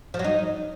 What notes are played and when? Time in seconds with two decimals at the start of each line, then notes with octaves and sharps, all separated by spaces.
0.14 F3
0.19 F#3
0.24 D#4